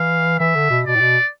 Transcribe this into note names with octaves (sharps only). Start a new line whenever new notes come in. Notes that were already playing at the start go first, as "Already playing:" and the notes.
Already playing: E3 F5
E3 E5
D3
B2
B2 D5
A2
B2